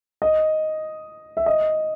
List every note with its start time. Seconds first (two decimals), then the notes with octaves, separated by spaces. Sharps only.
0.22 D#5
1.37 E5
1.46 D#5